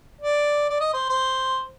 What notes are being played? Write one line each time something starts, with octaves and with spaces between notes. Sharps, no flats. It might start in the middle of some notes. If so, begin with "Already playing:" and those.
D5
D5
D#5
C5
C5